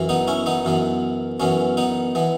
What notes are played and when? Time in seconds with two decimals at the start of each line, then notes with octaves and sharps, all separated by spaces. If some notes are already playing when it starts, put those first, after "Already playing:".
Already playing: F#2 E3
0.09 B3 D#4
0.28 C#4 E4
0.46 B3 D#4
0.65 F#2 E3 B3
1.40 F#2 E3 B3 C#4
1.77 B3 D#4
2.15 E3 B3